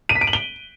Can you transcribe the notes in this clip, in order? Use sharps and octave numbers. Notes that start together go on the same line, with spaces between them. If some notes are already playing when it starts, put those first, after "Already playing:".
D#7
B6
D7
F#7
G7